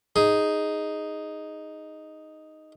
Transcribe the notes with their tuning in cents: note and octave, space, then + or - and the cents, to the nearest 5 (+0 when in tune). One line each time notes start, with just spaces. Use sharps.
D#4 +0 G#4 +0